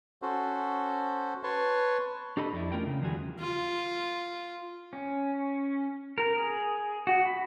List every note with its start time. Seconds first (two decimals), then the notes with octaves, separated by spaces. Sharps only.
0.22 C#4 F#4 A4 C5
1.43 B4 C#5 A5 C6 C#6
2.37 D4 G4 A4 D#5 B5
2.53 F2 D4 E4
2.72 E2 A3 C#4 F4 A#4 G5
2.86 C#3
3.02 E2 D#3 F3 G3 F#4 G#4
3.40 F4
4.93 C#4
6.18 A#4
6.36 G#4
7.07 F#4
7.25 B5